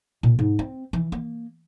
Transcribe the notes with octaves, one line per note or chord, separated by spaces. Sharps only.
A#2
G#2
C4
E3
A#3